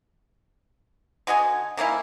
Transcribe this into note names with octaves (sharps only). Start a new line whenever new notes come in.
D3 F#4 D#5 G#5
D#3 A#3 C#4 E4